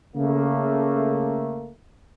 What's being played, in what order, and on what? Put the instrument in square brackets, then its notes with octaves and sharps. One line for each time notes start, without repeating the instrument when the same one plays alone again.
[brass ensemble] C#3 A3 A#3